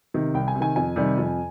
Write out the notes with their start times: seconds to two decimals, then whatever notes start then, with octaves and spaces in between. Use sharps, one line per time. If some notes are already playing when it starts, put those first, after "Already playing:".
0.14 C3 D#3
0.34 C2 G5
0.48 G#5
0.55 C3
0.60 D#3 G#5
0.76 F2 G#5
0.96 C3 D#3 G3
1.18 F2